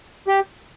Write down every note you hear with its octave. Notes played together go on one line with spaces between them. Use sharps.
G4